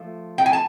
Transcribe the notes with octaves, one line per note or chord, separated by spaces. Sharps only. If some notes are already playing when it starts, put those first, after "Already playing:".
Already playing: F3 A3
G5
G#5
A5